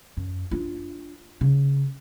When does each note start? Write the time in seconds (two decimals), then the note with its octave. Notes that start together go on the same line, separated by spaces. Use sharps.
0.17 F#2
0.51 D4 F4
1.41 C#3